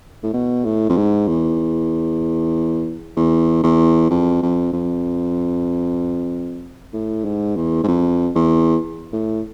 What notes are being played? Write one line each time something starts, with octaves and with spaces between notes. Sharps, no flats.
A2
B2
A2
F2
G#2
E2
E2
E2
F2
F2
F2
A2
G#2
E2
G#2
F2
E2
A2